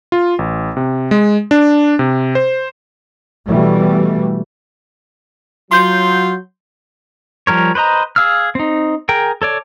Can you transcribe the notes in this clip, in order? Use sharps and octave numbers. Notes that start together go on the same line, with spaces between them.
F4
A1
C3
G#3
D4
C3
C5
B2 E3 G3 A3
F#3 F4 C6 G6
F3 G3 A#4 C#5
B4 C5 D#5 A#5
G#4 F5 E6 F6
C4 D#4
G#4 A#4 G5
A4 C#5 D5